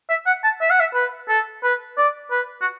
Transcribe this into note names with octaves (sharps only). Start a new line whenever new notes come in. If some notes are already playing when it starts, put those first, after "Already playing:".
E5
F#5
A5
E5
F#5
E5
B4
A4
B4
D5
B4
F#4